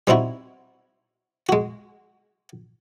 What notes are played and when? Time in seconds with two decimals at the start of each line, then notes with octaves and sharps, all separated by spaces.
0.07 G3 C4 D#4 E4 F#4
1.49 G#3 F#4